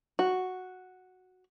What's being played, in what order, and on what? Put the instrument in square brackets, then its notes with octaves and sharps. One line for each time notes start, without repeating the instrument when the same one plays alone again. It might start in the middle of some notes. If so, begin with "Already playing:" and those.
[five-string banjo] F#4